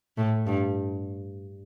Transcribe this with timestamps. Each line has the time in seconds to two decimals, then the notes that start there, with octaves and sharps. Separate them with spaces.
0.17 A2
0.46 G2